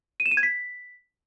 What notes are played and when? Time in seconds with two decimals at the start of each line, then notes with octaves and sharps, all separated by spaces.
0.20 D#7
0.26 E7
0.31 D#7
0.37 G#6
0.43 B6